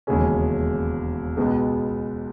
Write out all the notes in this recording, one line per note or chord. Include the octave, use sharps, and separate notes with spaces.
E1 D#2 C#3 G#3 C#4
C#2 B2 G#3 B3